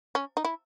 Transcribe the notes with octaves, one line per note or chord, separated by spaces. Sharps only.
C#4
D#4
E4